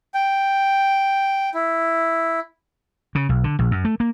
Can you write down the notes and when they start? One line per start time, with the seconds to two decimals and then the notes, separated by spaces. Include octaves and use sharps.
0.14 G5
1.54 E4
3.15 C#3
3.29 B1
3.44 D3
3.59 A#1
3.71 F#2
3.85 A3
4.00 A#3